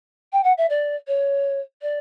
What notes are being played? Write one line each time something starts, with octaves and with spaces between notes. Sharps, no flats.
G5
F#5
E5
D5
C#5
D5